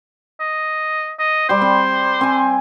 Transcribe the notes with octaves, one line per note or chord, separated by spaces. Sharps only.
D#5
D#5
G3 C5 G5
C4
C4 G#5